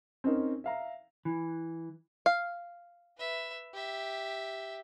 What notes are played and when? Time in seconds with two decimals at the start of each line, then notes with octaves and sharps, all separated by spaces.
0.24 C4 C#4 D#4 A#4
0.64 E5 F5 A#5
1.25 E3
2.26 F5
3.17 B4 E5
3.74 G4 E5